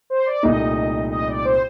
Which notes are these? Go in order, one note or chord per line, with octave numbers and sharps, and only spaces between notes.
C5
D5
C2 A#2 A3 D#4 D#5
D#5
D5
C5